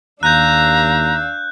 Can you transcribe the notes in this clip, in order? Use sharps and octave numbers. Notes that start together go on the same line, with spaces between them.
D#2 D4 F5 A#5 E6 F#6 G6